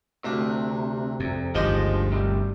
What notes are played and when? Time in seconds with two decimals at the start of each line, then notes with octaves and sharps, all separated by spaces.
0.24 D2 C3 D4
1.20 F2
1.55 G1 D2 D#3 F3 G#3 G4 D#5
2.12 C3 G3